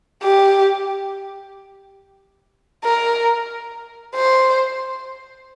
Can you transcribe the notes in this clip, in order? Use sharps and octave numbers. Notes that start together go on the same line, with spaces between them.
G4
A#4
C5